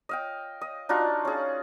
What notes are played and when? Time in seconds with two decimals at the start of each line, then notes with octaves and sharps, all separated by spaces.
0.09 D#5 F5 G5
0.61 D#5
0.89 D4 D#4 F4 F#4
1.25 C#4 G#4